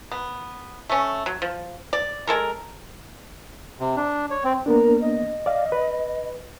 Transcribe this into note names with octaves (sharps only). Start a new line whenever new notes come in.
B3
A3 C#4
F#3
F3
D5
G#3 A4 A#4
C3
D4
C#5
C4
A#3 B3 D4 A#4
D#5
D5 F5
B4